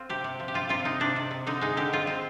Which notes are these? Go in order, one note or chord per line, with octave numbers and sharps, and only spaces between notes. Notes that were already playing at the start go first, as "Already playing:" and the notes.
Already playing: C4 F4
C3 G4
C3
F3
G4
C3 F4
C3 F4
C3 D#4
C3 D4
C3
C3
D3 D#4
G#3 D#4
D3 G4
C4 F4
C4